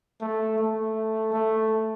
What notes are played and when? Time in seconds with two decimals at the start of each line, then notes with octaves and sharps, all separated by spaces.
0.21 A3
0.58 A3
1.33 A3